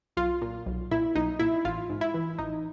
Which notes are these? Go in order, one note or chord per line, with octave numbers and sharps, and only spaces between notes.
B1 F4
A#2
B1
A#2 E4
B1 D#4
A#2 E4
A1 F4
G#2
E4
E3
A1 D#4